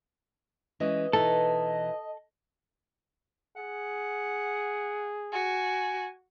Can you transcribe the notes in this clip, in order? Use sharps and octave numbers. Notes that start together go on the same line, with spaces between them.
E3 G#3 C#4 D#5
B2 E3 D#4 A4
G#4 F#5
F#4 G#5